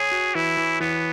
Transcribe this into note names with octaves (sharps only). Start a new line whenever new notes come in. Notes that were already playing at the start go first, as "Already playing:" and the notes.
Already playing: G#4 C#5
F#4
E3 E4
E3
E3 B3